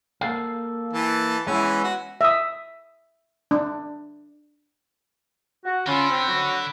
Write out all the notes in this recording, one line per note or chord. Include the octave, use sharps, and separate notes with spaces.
A#3 A4 F5
E3 A5
E3 G#3 B3 C#4 E4
F#4
E5 D#6
D4
F#4
D3 C#4 F4 B5
C4
F#3 F#4